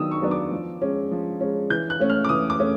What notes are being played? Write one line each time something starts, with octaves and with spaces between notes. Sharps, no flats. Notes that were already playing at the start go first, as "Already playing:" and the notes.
Already playing: D#3 F#3 B3 D4 D#6 E6
C#6
F#3 B3 D4
D6
F3
G#3 C#4
F3
G#3 C#4
E3 G6
F#6
A3 C#4
F6
D6
E3 D#6
D6
A3 C#4